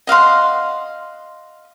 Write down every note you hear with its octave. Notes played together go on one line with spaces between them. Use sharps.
D#5 F5 F#5 C6